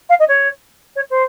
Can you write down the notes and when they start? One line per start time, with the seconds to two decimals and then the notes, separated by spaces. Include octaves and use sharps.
0.09 F5
0.19 D#5
0.28 C#5
0.95 C#5
1.10 C5